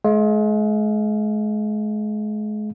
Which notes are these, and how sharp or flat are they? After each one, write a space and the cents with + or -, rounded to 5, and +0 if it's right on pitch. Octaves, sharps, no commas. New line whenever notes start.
G#3 +35 F5 +0